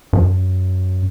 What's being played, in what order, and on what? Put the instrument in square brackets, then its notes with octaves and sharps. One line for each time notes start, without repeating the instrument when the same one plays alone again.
[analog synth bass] F#2